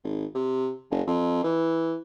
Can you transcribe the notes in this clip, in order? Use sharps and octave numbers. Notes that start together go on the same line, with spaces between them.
G#1
C3
F#1
F2
E3